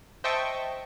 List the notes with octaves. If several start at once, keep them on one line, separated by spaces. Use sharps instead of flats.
C5 D#5 E5 G5 A5 C#6